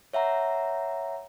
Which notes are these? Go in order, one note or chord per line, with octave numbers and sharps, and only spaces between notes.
C#5 E5 F#5 A#5